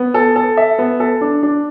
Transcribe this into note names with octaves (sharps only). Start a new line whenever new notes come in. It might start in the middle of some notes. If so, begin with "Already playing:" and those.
Already playing: B3
A4
A4
E5
B3
A4
D4
D4